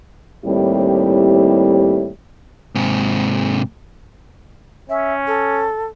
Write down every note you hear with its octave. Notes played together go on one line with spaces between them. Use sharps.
D#2 A2 G3 C4 E4 G4
G#2 C3
C#4 E5
A4